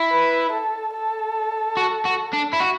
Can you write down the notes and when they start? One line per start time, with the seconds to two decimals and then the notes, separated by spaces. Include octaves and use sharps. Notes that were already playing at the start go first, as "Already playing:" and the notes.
Already playing: E4
0.10 B4
0.52 A4
0.94 A4
1.77 F#4
2.05 F#4
2.33 D4
2.53 E4
2.60 F#4